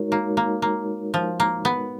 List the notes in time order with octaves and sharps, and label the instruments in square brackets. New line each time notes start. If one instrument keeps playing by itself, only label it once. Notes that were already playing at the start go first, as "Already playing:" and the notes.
Already playing: [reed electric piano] G#3 D#4 F#4 A#4 C#5
[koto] A#3
A#3
A#3
F3
A#3
B3